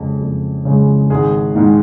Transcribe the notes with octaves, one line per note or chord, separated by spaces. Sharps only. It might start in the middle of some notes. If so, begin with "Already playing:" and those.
Already playing: F2 C#3 G#3
F2
C#3 G#3
G#1 G#4
G#2 D#3 G#3